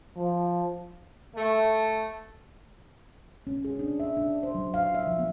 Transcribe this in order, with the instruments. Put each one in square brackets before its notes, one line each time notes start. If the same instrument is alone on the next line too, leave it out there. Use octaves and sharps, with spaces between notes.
[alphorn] F3
[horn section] A3
[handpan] C#4
G#4
D4
E5
D4
C5
F#3
F5
E5
F3
B3